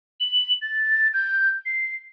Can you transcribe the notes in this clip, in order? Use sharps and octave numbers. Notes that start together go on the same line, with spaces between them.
F#7
A6
G6
C7